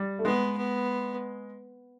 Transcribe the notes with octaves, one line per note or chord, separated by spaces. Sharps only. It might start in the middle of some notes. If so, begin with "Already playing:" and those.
Already playing: G3
A3
G#3 B3
B3